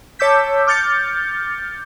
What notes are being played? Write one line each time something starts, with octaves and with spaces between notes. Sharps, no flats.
C#5 A5 D6 E6 G6 B6
D6 F6 G6 A6 C#7